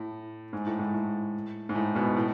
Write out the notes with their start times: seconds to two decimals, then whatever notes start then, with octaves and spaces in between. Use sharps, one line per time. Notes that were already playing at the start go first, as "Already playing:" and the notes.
Already playing: A2
0.53 G#2
0.66 A2
0.79 G#2
0.94 A2
1.69 G#2
1.75 A2
1.95 G#2 B2
2.16 A2